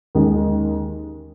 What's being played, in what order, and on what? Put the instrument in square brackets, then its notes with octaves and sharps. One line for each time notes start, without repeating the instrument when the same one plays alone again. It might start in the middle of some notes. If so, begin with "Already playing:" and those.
[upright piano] D#2 D#3 G#3 C#4